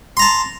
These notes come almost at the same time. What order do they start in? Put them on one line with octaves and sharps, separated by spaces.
C6 A#5 A5